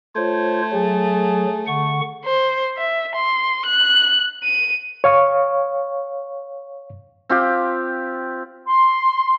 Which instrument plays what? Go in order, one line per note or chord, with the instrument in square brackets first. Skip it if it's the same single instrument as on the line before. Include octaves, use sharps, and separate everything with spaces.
[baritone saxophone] A3 [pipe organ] F4 C5 C#5
[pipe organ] F#3 [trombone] G#4
[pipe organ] D3 F#5 C#6
[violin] C5
E5
C6
F#6
D#7
[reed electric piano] C#5 F5 C#6
[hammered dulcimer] C4 F4 G4
[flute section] C6